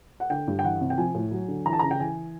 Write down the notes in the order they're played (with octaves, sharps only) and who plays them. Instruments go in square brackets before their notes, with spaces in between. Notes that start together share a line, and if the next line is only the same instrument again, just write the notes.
[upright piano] F#5
D3 G5
G2
G5
E3 F#5
C3
G5
F3 G#5
A2
F#3
D3
E3 A#5
A5
C#3 A#5
G5
E3 G#5